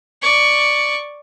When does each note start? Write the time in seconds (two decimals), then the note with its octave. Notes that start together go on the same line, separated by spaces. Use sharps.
0.22 D5 C#6